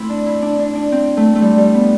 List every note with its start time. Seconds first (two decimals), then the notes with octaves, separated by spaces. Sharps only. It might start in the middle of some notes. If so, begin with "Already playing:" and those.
Already playing: A3 C4 E4
0.09 D4
0.26 E4
0.42 D4
0.59 D4
0.75 D4
0.92 C4
1.17 A3
1.35 A3
1.42 G3
1.58 G3
1.74 B3